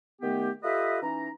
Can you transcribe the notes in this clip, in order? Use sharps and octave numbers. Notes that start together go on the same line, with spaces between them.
D#3 A3 B3 G4
F4 G4 A4 B4 D#5 E5
E3 C#4 D#4 A#5